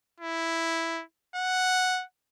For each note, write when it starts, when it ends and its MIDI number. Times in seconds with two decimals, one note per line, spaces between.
0.20 1.03 64
1.36 2.04 78